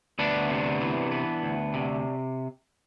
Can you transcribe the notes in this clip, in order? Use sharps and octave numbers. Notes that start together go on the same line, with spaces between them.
D2 B3 D4
C3
E3
B3
D2
C3